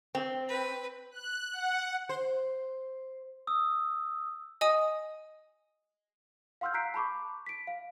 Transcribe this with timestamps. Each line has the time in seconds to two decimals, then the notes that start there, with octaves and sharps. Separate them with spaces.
0.15 C4
0.49 B4
1.11 F#6
1.53 F#5
2.09 C5
3.47 D#6 E6
4.61 D#5 G#5 D#6
6.61 F5 F#5 C6 E6 F6 G6
6.74 A#5 F#6 G6 B6 C7 D7
6.94 A5 B5 C#6 D6
7.46 B6 D7
7.67 F5